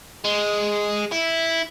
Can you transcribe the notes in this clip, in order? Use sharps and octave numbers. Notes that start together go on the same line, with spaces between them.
G#3
E4